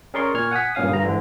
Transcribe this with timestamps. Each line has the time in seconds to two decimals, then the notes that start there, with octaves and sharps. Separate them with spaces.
0.14 C#4 G#4 A#4 D5 C6 C#6
0.34 A#2 C#6 F6 G#6
0.51 F#5 G#5 D#6 B6
0.75 G2 A#2 C#4 F5 D#6
0.89 G2 D3 A#5
1.03 G#2 D3 E3